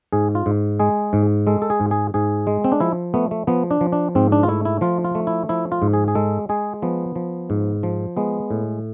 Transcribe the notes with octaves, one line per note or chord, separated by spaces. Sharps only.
G#2 G#4
F4
G#2
G#3 G#4
G#2
G#3 A4
A4
G#4
G#2
G#4
G#2 G#4
G#3
C4
D4
F3 E4
A3 B3
A3
F3 B3
D4
F3
D4
G#2 C4
D4
F4
A3 E4
E4
F3 F4
F4
A3
E4
F3 E4
F4
G#2
G#4
G#4
G#3 A4
G#3 G#4
F3 B3
F3
G#2
F3
G#3 B3
A2